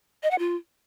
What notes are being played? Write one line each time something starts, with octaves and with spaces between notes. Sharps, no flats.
D#5
F#5
F4